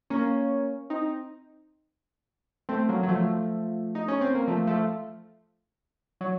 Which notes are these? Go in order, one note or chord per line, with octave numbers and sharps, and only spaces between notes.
A#3 C#4
C4 D#4
A3 C4
F#3 A#3
F#3
F3 A3
D#4
C#4
C4
A#3
F3 A3
F3 A3
F#3